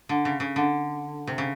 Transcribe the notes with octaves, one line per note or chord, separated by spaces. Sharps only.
D3
C#3
C#3
D3
C3
C#3